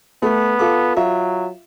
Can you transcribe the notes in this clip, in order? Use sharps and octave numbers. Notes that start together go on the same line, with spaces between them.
A3 B3
F4 A4 D6
F#3 F4 E5